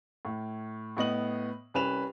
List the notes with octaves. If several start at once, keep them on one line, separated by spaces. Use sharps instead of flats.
A2
A2 B3 D#5 F#7
C2 C#4 B4 E7 F7